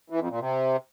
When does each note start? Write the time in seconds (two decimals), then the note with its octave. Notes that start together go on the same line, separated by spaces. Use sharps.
0.10 E3
0.20 F2
0.30 A#2
0.40 C3